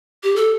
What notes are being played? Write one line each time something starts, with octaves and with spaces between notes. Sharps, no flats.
G4
A4